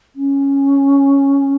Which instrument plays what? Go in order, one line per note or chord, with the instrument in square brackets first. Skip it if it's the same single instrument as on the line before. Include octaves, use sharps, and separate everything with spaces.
[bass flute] C#4